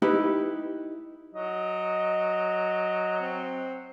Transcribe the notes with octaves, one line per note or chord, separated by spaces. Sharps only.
D#4 E4 G4 B4
F#3 D#5
C4